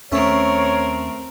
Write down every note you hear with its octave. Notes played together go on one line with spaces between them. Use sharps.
D#2 A3 C4 C#4 A#4 C#5